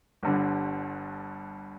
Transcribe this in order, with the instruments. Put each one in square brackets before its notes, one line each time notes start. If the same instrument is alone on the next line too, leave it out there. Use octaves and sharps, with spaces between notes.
[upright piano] G1 G2 D3